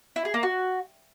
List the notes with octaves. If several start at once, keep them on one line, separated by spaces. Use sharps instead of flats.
E4
G#4
A#3
F#4